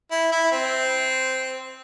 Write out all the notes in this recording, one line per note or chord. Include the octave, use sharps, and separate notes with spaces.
E4
E4
C4